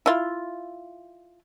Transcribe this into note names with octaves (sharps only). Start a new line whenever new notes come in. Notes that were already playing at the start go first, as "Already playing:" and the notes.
E4 F4